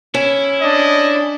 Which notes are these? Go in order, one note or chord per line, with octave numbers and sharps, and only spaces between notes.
C#4 E4
D4 D#5